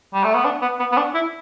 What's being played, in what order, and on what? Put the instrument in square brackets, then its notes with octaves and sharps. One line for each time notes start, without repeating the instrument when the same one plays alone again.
[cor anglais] G3
A3
B3
D4
B3
B3
B3
D4
E4